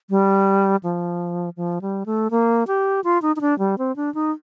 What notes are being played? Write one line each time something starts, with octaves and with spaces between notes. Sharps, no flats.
G3
F3
F3
G3
A3
A#3
G4
F4
D#4
D#4
D4
G3
C4
D4
D#4